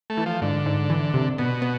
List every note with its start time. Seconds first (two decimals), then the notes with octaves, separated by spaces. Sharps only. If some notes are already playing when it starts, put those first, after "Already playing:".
0.10 A3
0.17 E3
0.26 F3
0.42 G#2 D3
0.66 G#2
0.90 E3
1.14 C3
1.38 B2 B3
1.62 B3